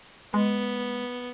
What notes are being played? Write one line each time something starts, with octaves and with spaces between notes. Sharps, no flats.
G#3 B3